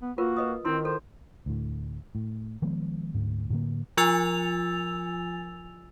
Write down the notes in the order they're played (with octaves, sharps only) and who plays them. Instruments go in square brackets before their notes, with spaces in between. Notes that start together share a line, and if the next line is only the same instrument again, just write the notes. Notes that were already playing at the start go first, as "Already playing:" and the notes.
[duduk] B3
[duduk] A#3 [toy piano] F4 A#4 B4 [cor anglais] F#4
[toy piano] B4 D#5 D#6
[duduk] D#3 [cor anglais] C4 [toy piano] E4 C6
[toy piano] A4 [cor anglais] C5
[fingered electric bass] D2 A2
A2
D#3 F3 G#3 B3
D2 G#2
A2 D3 A#3
[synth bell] F3 F4 G#5 E6 A6 F7